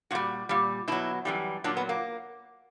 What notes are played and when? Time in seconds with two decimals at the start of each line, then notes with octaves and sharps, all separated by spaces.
0.11 A#2 G3 F#4
0.49 A#2 G3
0.88 B2 F#3 E4
1.25 F#2 E3 G3
1.64 A#2 F#3 D4
1.77 B3
1.89 A#3